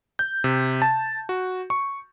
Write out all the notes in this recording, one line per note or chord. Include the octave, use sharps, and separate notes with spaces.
G6
C3
A5
F#4
C#6